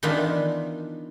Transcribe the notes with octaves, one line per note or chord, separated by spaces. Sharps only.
D#3 E3 B3 D4 E4 F4